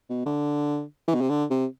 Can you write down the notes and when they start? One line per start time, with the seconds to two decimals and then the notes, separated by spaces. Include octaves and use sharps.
0.10 B2
0.26 D3
1.08 E3
1.15 B2
1.21 C3
1.29 D3
1.50 C3